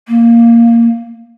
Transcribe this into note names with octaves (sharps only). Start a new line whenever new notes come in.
A#3